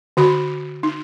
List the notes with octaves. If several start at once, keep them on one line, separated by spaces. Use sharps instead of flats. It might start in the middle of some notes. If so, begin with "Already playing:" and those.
D3 F#4 B5
D#4